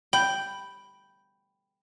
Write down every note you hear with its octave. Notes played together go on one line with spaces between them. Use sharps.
G5 B5